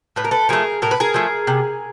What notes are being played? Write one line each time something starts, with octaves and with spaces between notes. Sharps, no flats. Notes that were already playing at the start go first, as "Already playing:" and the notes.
A2 B4
A#4
A4 B4
F3 A3 G#4 A#4
A2 A#4
B4
G#4 A#4
F3 A3
C3